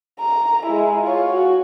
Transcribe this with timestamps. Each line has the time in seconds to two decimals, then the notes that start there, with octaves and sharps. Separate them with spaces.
0.20 A#5
0.65 G#3 E4
1.02 F4 C#5
1.32 F#4